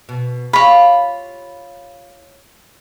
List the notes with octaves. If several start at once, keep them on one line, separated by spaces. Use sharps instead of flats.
B2
F4 G4 C#5 B5